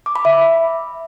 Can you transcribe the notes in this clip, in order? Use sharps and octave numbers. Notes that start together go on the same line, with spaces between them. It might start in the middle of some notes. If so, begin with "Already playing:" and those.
D6
B5
E5